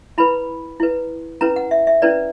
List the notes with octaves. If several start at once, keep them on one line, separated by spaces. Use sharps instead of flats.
E4 B4 B5
E4 B4
C#4 E4 B4 A#5
F#5
E5
E5
C#4 E4 B4 D5